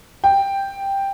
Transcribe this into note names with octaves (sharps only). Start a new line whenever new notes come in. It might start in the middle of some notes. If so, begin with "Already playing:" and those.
G5